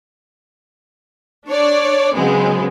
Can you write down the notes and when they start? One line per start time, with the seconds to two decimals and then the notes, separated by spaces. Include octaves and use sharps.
1.46 D4 C#5 D5
2.15 C#3 F#3 G#3 B3 C4